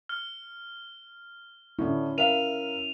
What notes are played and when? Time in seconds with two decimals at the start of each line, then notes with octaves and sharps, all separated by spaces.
0.09 F6
1.79 A2 D3 C#4 E4
2.18 A#4 E5 F5 D#7 F7